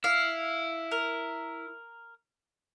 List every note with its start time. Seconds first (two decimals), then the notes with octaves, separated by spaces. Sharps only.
0.04 E4 F5
0.91 A#4